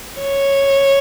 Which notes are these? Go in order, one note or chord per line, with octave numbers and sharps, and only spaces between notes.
C#5